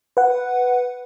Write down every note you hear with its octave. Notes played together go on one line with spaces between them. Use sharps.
B4 F#5